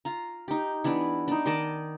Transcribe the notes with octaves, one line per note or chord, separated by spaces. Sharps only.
F4 A#5
D#4 G4
E3 B3 D4 B5
D4 D#4
D#3 D5 D#5 A5